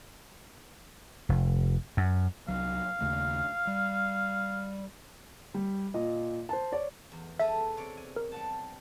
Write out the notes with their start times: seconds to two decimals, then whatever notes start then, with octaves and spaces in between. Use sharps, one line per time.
1.29 F1
1.97 F#2
2.48 C2 F#3 F5
3.01 D#2 C#3 A3
3.67 G3
5.54 G3
5.94 A#2 D#5
6.49 C5 A5
6.72 C#5 D5
7.12 E2
7.40 G#4 A4 B4 E5
7.77 C3 C#5 D5
7.97 G#5
8.16 A#4
8.32 G3 F#5 A5